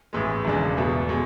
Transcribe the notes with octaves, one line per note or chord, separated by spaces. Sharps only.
A1 A2 E3 G#3
E1 E2 C#3 G#3 D4
E2 B2 A3
B2 G#3